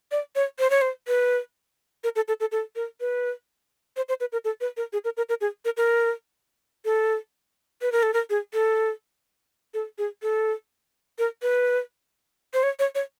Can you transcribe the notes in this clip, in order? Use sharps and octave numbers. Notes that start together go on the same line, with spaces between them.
D5
C#5
C5
C#5
C5
B4
A#4
A4
A4
A4
A4
A#4
B4
C5
C5
B4
A#4
A4
B4
A#4
G#4
A#4
A#4
A#4
G#4
A#4
A#4
A4
B4
A#4
A4
A#4
G#4
A4
A4
G#4
A4
A#4
B4
C5
C#5
C#5
C#5